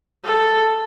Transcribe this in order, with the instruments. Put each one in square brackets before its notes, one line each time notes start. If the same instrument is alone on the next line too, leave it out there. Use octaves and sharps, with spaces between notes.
[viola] A4